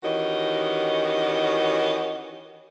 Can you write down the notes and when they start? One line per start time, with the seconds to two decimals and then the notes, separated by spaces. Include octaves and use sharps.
0.03 D#3 E3 C#4 F#4 G4 D#5